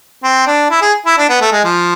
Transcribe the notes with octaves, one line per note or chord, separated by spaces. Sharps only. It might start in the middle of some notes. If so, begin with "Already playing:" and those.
C4
D4
E4
G#4
E4
D4
B3
A3
G#3
F3